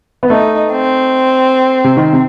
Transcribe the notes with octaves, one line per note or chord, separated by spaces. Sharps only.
B3
A3 D#4
C4
C3
D#3
C3